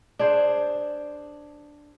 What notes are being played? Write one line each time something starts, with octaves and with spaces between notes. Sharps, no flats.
D4 G#4 C5